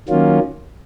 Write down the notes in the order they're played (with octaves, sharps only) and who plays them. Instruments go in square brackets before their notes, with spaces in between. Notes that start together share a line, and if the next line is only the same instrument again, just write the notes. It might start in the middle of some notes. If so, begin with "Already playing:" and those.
[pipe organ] D#3 F#3 A#3 C#4 F4